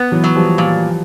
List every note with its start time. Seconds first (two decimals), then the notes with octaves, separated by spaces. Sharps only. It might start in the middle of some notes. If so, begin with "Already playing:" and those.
Already playing: B3
0.11 E3 F#3
0.24 F#3
0.35 F3 G3
0.58 A#2